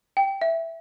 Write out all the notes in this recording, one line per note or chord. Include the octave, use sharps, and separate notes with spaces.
G5
E5